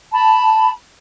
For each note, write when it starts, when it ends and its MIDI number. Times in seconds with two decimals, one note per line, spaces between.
0.13 0.70 81
0.13 0.70 83